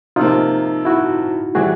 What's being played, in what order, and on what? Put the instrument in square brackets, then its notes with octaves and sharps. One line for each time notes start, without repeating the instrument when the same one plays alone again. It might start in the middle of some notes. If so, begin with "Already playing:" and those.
[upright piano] C3 F3 A#3 [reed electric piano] D#4 F4
[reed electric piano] E4 F#4
[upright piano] E3 G3 [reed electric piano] F#4 G#4